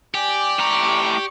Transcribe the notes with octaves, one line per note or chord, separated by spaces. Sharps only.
G4 D5 G#5
A2 A#5 C#6